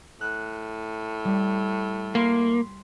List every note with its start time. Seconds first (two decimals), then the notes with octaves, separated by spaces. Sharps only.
0.21 A2 F#6
1.25 G3
2.15 A#3 B5 C6 C7